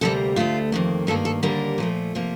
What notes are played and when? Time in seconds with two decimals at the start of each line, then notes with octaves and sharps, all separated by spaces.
0.01 D2 C3 D#3 G3 A#3 A4
0.36 D2 D3 A3 F4
0.72 F2 D#3 A#3
1.07 G2 D#3 A#3 A4
1.25 A4
1.43 D#2 D3 G3 A#3 A#4
1.78 A#2 F3 A3
2.15 C3 F3 A#3